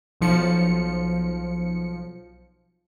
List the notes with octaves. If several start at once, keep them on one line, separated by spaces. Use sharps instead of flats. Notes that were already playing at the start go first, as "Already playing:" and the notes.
B1 F3 C#7